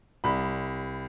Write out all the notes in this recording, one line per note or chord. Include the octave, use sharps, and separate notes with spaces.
C2 B5